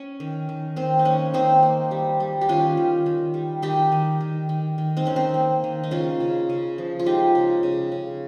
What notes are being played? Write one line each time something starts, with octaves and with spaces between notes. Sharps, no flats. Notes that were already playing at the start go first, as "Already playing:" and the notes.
Already playing: C#4
D#3
D#3
D#3 C4
D#4
A#3 C#4
D#3 C4 D#4
A#3
G3
G3
G4
D#3 C#4 F4
D#3
D#3
G3
D#3 D#4 G4
D#3
D#3
D#3
D#3
C4 D#4
D#3 C#4
C4
A#3
D#3
D#4
C#3 C#4 F4
C#3
C#3
F3
F4
G#3 D#4 G4
C#3
C#3
C#3